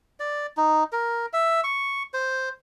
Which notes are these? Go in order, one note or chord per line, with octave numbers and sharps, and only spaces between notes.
D5
D#4
A#4
E5
C#6
C5